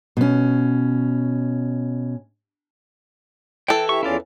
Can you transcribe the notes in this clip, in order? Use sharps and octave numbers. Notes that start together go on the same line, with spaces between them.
B2 C#4
E3 A4 G5
E4 G4 E5 C#6
E2 C#4 E4 F4 D5 F5